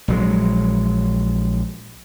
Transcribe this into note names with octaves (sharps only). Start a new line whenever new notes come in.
A#1 F#3 G#3